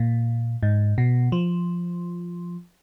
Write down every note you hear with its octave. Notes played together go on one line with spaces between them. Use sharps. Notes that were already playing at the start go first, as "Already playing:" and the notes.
Already playing: A#2
G#2
B2
F3